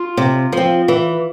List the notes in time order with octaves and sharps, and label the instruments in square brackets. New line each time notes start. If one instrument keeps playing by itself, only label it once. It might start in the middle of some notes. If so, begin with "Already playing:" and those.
Already playing: [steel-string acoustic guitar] F4
C3
F3 C4
E3